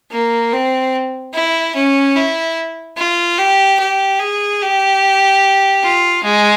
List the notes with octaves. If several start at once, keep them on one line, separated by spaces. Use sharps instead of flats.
A#3
C4
E4
C#4
E4
F4
G4
G4
G#4
G4
F4
G#3